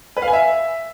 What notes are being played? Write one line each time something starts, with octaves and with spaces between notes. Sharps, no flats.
B4
F5
G#5
E5